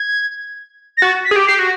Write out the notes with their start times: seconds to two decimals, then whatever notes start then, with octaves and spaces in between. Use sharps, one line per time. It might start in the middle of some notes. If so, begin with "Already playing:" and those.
Already playing: G#6
0.97 A#6
1.02 F#4 A6
1.25 B6
1.31 G#4
1.36 G4
1.47 G4 C7
1.59 F#4